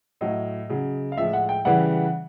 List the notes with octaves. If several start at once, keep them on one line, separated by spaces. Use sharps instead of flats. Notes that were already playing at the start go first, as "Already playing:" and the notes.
A2 F#3 D#5
C#3 F#3
F5
A2 F3 G#3 E5
F#5
G5
C#3 E3 G3 F#5